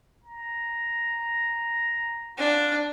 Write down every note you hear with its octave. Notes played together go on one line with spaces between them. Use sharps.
A#5
D4 F4